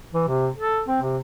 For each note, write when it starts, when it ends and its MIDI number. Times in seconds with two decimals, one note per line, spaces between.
0.14 0.24 52
0.28 0.48 48
0.56 0.81 69
0.88 0.97 60
1.01 1.18 48